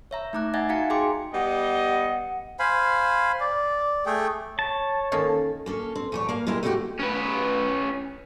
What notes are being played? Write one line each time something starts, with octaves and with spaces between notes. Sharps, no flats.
C#5 E5 A#5
A3 D#4 A#5 D6 F#6
D#5 E5 F#5 G#5 G#6 A6
D#4 F#4 F5 A#5 C#7
G#4 G5 G#5 C6 D6
G3 B3 D#5 F#5
C5 F5 G#5 B5
D5
A3 G#4 A4 G5
C#5 A5
D#3 A#3 C#4 A4
A#3 C#4 A4
C4
E2 A3 C#5
A#3 F5
A#2 G#3 E4 G4 A#4
A3 A#3 D4 E4 F#4 G4
C#4 B4